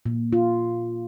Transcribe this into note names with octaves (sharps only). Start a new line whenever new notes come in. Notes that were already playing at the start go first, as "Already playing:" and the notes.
A#2
F4